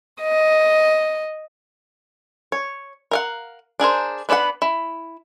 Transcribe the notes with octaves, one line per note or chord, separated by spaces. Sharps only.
D#5
C#5
A#4 F5 F#5
D4 G#4 A#4 C5
B3 D4 B4 D5 F#5
E4